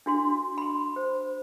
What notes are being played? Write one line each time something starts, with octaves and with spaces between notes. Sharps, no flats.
D4 F#4 C6
B5 C6
C5